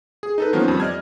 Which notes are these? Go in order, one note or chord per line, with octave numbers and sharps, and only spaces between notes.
G#4
D#4 A4 B4
D#3 F3 F#3 A#3 B3 C#4
F2 G3
D5 D#5 F6 G#6